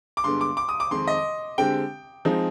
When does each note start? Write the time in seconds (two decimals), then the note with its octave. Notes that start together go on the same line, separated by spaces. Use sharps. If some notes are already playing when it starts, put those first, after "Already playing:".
0.17 D6
0.24 G2 D3 G#3 B3 C6
0.41 D6
0.57 D6
0.69 D#6
0.80 D6
0.91 F2 D#3 G#3 C4 C6
1.07 D#5
1.58 D3 G#3 C4 G4 G5
2.25 F3 G#3 C4 D#4